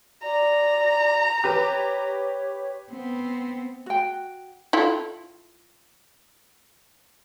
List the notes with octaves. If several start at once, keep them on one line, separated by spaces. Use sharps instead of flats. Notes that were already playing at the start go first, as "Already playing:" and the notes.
D5 A#5
G4 B4 C#5
B3 C4
F#4 G5
E4 F4 A4